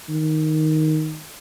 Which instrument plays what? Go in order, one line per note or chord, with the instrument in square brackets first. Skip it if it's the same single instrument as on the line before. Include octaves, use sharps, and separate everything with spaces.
[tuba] D#3